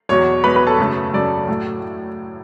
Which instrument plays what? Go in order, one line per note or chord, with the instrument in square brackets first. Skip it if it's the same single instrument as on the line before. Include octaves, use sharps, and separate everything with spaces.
[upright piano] E2 B2 F#3 C#5 C#6
E2 B2 F#3 B4 B5
B4 B5
A4 A5
F#2 C#3 F#3 A3
F#2 C#3 F#3 A3 D5
A2 F#3 A3